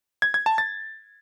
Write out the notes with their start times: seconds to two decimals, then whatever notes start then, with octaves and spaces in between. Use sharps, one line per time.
0.22 G#6
0.34 G#6
0.46 A5
0.58 A6